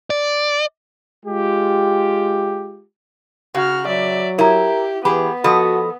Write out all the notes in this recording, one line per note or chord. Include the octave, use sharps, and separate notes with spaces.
D5
G#3 F4 G4
C#3 F#4 F6
F#3 D5 E5
E4 G4 A#4 A#5
E3 B3 G4 G#4 B5
F3 F#4 A4 D#5 B5 D#6